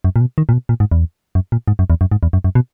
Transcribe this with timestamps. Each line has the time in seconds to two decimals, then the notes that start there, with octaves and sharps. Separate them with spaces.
0.04 F#2
0.16 A#2
0.21 B2
0.38 D#3
0.49 A#2
0.53 B2
0.69 A#2
0.80 G#2
0.92 E2
1.35 F#2
1.52 A#2
1.68 G#2
1.79 F#2
1.90 E2
2.01 F#2
2.11 G#2
2.23 E2
2.33 F#2
2.44 F#2
2.55 B2